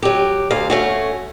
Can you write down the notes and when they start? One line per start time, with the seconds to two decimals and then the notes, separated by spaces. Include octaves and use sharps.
0.02 F#3 G4
0.51 D2 F5
0.70 A3 C#4 F#4